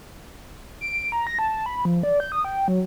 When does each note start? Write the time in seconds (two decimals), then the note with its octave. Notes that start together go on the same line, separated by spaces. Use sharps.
0.81 D7
1.12 A#5
1.27 A#6
1.39 A5
1.66 B5
1.85 F3
2.03 D5
2.20 G6
2.32 D#6
2.45 G5
2.68 F#3